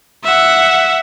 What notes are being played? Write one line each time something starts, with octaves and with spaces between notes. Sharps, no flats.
E5 F#5